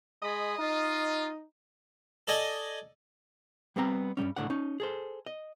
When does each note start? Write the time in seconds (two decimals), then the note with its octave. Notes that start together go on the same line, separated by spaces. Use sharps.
0.22 G#3 G#4 D#5 B5
0.59 D#4 F4
2.27 A4 D5 D#5 G#5
3.76 G3 B3 C4 A#5
4.17 G2 B2 G3 C#4
4.36 C#2 A2 D3 F#5
4.50 C#4 D#4
4.80 G#4 A4 C5
5.26 D#5